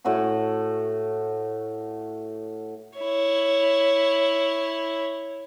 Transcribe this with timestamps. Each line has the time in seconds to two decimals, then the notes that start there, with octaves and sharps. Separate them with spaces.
0.04 A2 F#4 F#5 C#6
2.99 E4 C#5